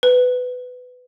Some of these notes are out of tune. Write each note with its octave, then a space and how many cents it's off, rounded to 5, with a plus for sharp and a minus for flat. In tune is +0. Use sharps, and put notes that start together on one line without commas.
B4 +15